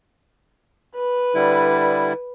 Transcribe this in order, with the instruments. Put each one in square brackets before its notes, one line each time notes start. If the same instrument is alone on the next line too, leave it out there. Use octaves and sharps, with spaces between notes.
[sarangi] B4
[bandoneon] D3 G3 E4